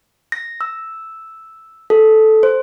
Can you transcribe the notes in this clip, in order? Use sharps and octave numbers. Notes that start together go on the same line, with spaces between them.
A#6
E6
A4
C5